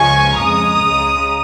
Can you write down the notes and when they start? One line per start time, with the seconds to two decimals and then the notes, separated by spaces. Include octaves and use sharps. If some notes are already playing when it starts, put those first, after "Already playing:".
Already playing: C#2 C#3 F3 G#3 G#5 C#6
0.38 F2 C#3 G#3 A#5 D#6
0.84 C#2 C#3 G#3